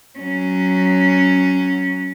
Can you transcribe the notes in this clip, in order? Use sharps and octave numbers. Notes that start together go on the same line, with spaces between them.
F#3 C#4